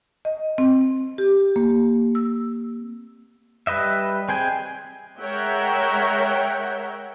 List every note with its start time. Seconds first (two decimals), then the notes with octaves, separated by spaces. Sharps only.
0.25 D#5
0.58 C4
1.18 G4
1.56 A#3
2.15 E6
3.67 G3 B4 D#5 E5
4.29 C4 G#4 G5 G#5
5.20 G#3 A#4 C#5 E5 F#5 G5